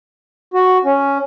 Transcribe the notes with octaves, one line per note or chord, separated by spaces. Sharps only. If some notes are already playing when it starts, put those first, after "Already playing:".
F#4
C#4